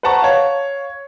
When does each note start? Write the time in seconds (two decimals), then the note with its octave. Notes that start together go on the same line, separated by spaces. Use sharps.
0.03 B4 C5 F#5 A5 A#5 C#6
0.22 C#5 F5